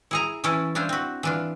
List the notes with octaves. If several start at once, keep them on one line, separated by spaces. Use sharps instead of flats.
E4 G#4 A#5
E3 C#4 E4 A4
D4 E4 F4 C5
C4 F#4
E3 D4 F4